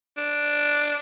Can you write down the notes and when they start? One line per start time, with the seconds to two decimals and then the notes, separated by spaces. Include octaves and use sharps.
0.17 D4